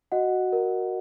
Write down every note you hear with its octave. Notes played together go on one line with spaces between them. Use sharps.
F#4 D#5 F#5
A#4